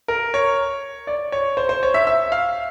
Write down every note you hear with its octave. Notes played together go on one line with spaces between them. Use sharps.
A#4
C#5
D5
C#5
C5
C5
C#5
E5
E5
F5